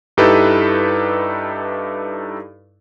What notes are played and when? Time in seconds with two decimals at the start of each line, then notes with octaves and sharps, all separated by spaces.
0.17 G2 D#4 E4 G4 A4 B4